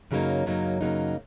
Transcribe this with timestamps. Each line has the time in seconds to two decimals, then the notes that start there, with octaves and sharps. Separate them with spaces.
0.11 F#2 C#3 F#3 A#3 D#4
0.46 F#2 C#3 F#3 A#3 D#4
0.81 F#2 C#3 F#3 A#3 D#4